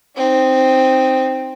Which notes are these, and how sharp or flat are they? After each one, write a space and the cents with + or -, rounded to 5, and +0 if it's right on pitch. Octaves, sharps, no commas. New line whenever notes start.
C4 +0 D#4 +0